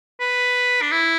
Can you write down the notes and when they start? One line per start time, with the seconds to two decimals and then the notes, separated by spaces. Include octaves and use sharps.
0.20 B4
0.81 D4
0.91 E4